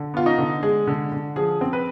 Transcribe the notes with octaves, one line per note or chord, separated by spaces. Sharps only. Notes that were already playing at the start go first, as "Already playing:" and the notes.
Already playing: D3
B3 F4
D#4
D3
G#3 G#4
D3
D3
F3 G#4
C4
B4